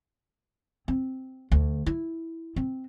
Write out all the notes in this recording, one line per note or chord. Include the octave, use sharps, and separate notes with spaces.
C4
D2
E4
C4